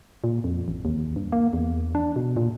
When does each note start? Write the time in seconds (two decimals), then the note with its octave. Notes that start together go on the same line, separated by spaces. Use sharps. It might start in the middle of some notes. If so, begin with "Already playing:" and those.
0.24 A#2
0.44 F2
0.68 A1
0.85 D#2
1.16 G2
1.32 A#3
1.53 E2
1.95 D4
2.16 B2
2.37 A#2